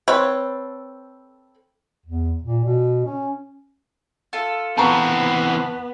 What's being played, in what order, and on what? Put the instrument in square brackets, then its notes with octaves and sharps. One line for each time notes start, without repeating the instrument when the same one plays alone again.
[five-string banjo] C4 A4 B4 C#5 B5
[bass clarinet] E2
A#2
B2
C#4
[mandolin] F4 A4
[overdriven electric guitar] E3 C4 [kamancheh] B3 [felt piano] A5 A#5 C#6